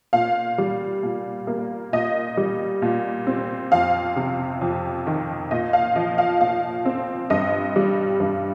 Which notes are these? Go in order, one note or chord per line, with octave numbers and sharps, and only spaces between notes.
A#2 F5
G3
A#2
A#3
A#2 D#5
G3
A#2
C4
F2 F5
C3
F2
D#3
A#2 D#5
F5
F3 D#5
F5
A#2 F5
C4
G2 D#5
G3
G2